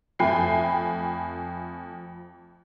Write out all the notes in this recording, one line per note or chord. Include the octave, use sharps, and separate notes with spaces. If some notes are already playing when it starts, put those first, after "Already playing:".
F2 A3 G5 G#5 B5 C7